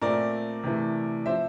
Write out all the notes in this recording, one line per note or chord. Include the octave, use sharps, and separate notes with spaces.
A#2 A3 C4 A#4 D5
C3 E3 A3
F3 C4 C5 E5